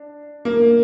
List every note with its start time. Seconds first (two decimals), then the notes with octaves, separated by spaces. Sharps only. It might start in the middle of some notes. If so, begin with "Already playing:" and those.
Already playing: D4
0.45 A#3